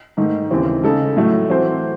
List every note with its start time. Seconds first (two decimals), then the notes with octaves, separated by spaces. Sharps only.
0.17 G#2 D#3 A3 D#4
0.50 D#2 C#3 E3 C4 E4
0.83 C#3 G#3 D#4 A4
1.17 A2 F#3 A3
1.50 E3 C4 F#4 C5